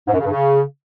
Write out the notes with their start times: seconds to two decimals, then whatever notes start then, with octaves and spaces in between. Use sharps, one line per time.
0.08 G#2
0.14 F#2
0.19 C#3
0.25 G2
0.31 C#3